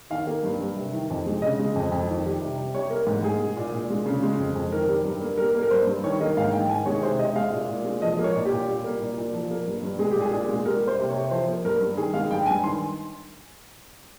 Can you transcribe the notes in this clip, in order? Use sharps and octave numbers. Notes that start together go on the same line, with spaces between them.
D#3 F5
A#3
G2
G2
C3
D#3
F2
G#3
C#3 D#5
G#3
F2
F2
D#3
G3
C3
C3
G3 C#5
A#3 A#4
G#2
G#2 G#4
G#3
A#2
A#2
G#3
C#3
G#3
F2
F2
D#3 A#4
G3
G2
A#3
G3 A#4
A#3
A#4
G2 C5
G2
D#3 C#5
A#3 D#5
G#2 F5
G#2 G5
D#3 G#5
G#3 C#5
C3 C5
C3 D#5
G#3 F5
A#2
A#2
G#3
F3 D#5
A#3
C#5
A#2
G4
A#2
G3
A#3
A#2
A#2
F3
A#3
G2
G2
G#3 G#4
G4
A#2 G#4
A#2 G#4
G#3
G3 A#4
A#3
C5
C3
C#5
C3
F3 C5
A#3
G2 A#4
G2
D#3 G#4
G#3 F5
G2 G5
G2 G#5
D#3 C6